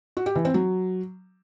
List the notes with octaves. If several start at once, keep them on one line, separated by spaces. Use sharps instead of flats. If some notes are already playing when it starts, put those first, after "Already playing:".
F#4
G4
E3
C4
F#3